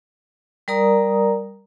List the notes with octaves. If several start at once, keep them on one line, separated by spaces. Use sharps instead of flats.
G3 A#4 D5 A#5 D#6